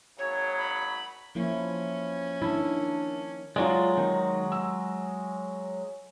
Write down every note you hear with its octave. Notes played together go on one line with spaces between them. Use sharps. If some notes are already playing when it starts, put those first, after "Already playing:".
G#1 C#3 F#3 C#5
B5
F3 A#3 C#4 E4
D#3 D4 E4
F#3 G#3 F4 D5
D#3 D#4
E6